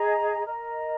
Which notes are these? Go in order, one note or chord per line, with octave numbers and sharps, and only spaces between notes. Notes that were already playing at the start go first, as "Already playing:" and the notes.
Already playing: G#4 D#5 A#5
A#4 D#5 A#5